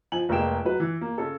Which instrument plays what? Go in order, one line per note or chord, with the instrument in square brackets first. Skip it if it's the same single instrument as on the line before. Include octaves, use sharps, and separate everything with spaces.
[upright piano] F3 G#5 F#7
F1 G#3 A#3 G#4 G5 E7
F#3 B4
E3
A#3
C#3 A4